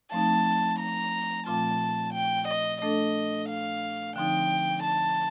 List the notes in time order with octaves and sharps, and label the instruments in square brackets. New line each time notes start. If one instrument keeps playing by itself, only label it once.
[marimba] F3 A3 C4 D#4 [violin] A5
[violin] A#5
[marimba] A#2 F3 A3 C4 F4 [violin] A5
[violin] G5
D#5
[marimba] A3 D4 A4 [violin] D#5
[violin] F5
[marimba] D3 F3 C4 D#4 [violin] G5
[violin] A5